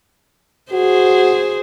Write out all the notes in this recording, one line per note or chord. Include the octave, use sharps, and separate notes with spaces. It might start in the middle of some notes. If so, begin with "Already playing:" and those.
F#4 G#4 C5